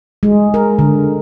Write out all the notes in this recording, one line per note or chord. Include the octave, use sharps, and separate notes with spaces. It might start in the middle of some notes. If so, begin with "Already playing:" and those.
G#3
A#4
D3